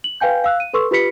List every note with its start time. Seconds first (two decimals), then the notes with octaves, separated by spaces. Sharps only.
0.04 F#7
0.20 B4 F5 G5 G#5 G6
0.44 F5 E6 F#6
0.60 D#7
0.73 A4 B4 C6 C#6 E6
0.91 F4 G4 B4 B5 B6 C#7